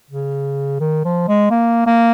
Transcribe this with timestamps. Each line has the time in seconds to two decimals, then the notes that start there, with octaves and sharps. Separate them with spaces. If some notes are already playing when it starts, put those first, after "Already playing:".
0.10 C#3
0.81 D#3
1.05 F3
1.28 G#3
1.51 A#3
1.87 A#3